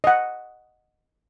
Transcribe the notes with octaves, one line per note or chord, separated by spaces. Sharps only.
D#5 F#5